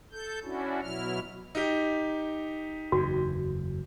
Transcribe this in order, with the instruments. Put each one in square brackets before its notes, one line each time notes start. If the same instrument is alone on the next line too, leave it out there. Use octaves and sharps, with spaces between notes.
[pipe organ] A4 G6
C#4 D4 E4 F#4
B2 F#3 E4 F6
[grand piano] D#4 G4
[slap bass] F#1 E2 [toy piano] F#4